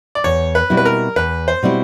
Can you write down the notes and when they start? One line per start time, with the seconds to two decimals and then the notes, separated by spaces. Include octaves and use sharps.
0.15 D5
0.24 E2 C#5
0.55 B4
0.70 B2 G3 C4 E4
0.77 B4
0.85 A#4
1.16 E2 B4
1.48 C5
1.63 B2 G3 C4 E4